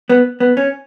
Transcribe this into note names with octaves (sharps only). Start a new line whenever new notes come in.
B3
B3
C#4